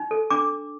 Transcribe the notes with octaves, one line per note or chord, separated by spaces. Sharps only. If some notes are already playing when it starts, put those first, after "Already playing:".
Already playing: D#4
A4
D4 D6